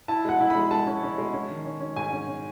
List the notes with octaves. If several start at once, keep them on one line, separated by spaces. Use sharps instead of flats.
E4 A5
G#3 F#5
E4
B5
G#3
G#3 A5
C#4
C#4
G#3
C#4
D#3
C#4
C#4
G#2 G#5
C#4
C#4